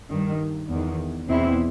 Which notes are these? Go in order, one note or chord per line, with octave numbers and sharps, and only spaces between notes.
G2 D#3
E2 D#3
E2 B2 C4 E4